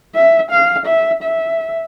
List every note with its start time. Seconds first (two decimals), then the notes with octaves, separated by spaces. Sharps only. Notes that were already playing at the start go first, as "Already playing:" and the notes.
0.15 E5
0.51 F5
0.86 E5
1.23 E5